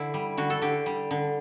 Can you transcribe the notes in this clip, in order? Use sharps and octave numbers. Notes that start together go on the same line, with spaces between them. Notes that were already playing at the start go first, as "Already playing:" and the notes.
Already playing: D3 E4
G3
D3 F#4
A4
D3 G4
G3
D3